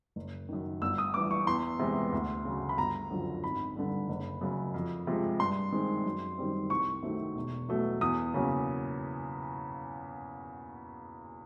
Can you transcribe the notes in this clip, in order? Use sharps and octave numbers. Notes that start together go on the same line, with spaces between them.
F#1
F#2 D#3
G1 E6
D#6
G2 E3 D6
C#6
E2 C6
C3 E3 G#3 B3
D2
C#3 F#3
B5
G1 A#5
F#2 D3 F3
G#1 B5
G2 D3
F#1
F#2 C#3
F2
C3 F3 G#3
G2 C6
D#3 G#3 C4
F#2
D#3 G3 C4
C2 C#6
C3 D#3 F#3 A3
E1
E2 B2 F#3 A3
E2 D#6
C#3 F#3 A#3 C#4